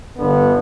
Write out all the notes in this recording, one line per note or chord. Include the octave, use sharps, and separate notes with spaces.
G1 G2 D3 B3